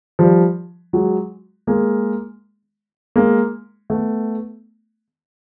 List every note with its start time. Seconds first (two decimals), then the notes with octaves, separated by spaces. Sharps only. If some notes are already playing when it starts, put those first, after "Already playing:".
0.19 F3 G3
0.93 F#3 G#3
1.67 G#3 A#3
3.16 G#3 A#3
3.90 A3 B3